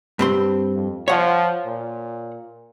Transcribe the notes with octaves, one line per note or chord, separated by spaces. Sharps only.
G2 C4 C6
F2
F3 C#5 F#5
A#2